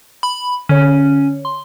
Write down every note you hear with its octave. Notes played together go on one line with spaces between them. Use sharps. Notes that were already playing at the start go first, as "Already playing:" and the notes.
B5
D3 C#4 C#5
C6